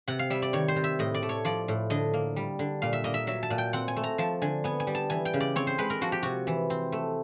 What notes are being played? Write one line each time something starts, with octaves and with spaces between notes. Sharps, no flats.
C3 F#5
F5
G3 E5
D5
D#3 C#5
C5
C3
E5
A2 D#5
D5
A3
C#5
F3 D5
A2
D3 D#5
A#3
G3
D3
A#2 F5
E5
A#3 D#5
E5
F#3 E5
A5
A#2
G5
C4 F#5
G#5
A3
A#5
F3 A5
D3 G#5
B3 G#5
G#5
G3
A5
E3 G#5
G5
C#3
D5
C4 C#5
C5
G#3 B4
A#4
F3 F#4
G4
C3 F#4
E3
C4
A3